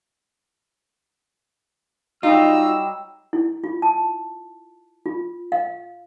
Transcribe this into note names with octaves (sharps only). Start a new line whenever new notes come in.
F#3 G3 D#4 F4 D#5 E6
E4
F4
A5
F4
F5